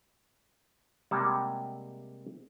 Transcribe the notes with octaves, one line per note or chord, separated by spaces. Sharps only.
C3 G3 G#3 A#3 F#5 A5